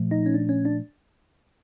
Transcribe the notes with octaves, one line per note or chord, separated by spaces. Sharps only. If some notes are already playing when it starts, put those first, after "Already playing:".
Already playing: A#2 F3 A3
D#4
C#4
D4
C#4
D4